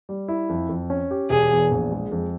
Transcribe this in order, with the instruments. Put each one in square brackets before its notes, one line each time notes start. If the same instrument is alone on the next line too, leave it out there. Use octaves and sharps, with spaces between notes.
[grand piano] G3
E4
F2
F2
C#4
G4
[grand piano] E1 [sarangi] G#4
[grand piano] E2
A#1
G#3
F2